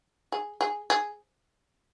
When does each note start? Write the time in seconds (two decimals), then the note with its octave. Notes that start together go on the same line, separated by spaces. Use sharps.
0.32 G#4
0.61 G#4
0.90 G#4